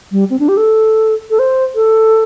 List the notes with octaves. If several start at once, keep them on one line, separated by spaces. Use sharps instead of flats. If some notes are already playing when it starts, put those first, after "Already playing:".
G3
C4
D4
G4
A4
A4
C5
A4